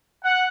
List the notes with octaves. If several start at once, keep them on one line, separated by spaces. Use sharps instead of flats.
F#5